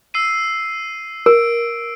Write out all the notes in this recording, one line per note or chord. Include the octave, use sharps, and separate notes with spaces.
E6 C7 D#7
A#4 D7